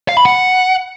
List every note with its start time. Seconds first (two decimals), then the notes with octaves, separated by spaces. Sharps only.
0.09 F5
0.17 B5
0.25 F#5